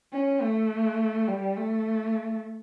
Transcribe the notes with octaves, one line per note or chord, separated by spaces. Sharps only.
C#4
A3
G3
A3